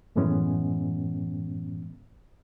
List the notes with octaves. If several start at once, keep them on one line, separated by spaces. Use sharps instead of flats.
F#2 A2 E3 G#3 B3 C#4